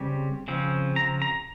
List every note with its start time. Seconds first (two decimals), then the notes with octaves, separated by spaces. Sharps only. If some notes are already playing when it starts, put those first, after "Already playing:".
Already playing: C#3 G3 C4
0.48 C#3 F3 C4
0.96 A#5
1.22 A#5